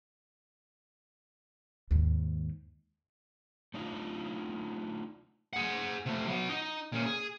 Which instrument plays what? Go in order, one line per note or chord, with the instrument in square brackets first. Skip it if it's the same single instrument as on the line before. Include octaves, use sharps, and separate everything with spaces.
[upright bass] D#2 G#2
[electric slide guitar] A3 D4 D#4 F4
[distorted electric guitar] G#4 F#5
C3 A3
F#3 B3
D#4 D#5
A#2 C#4
G#4